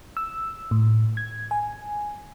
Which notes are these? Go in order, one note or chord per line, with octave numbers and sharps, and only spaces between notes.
E6
A2
G#6
G#5